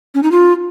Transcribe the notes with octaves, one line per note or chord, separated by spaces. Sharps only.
C#4
D#4
F4